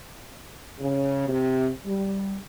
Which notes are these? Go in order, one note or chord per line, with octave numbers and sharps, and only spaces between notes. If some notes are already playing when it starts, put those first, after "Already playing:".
C#3
C3
G3